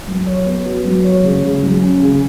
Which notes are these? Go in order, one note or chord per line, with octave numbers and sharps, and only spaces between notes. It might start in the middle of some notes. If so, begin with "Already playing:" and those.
F#3
C#5
B3
F#4
F#3
C#5
C#3
C#3
F#3
C#4
C#3